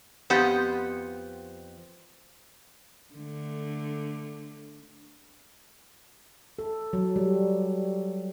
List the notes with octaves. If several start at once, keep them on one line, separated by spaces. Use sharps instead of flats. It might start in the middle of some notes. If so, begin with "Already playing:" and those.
F2 B3 G4 C5 F#5
D3 A3
A4
F#3
G3